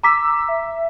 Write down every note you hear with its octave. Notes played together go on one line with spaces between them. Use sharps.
A#5 D6 E6 B6
E5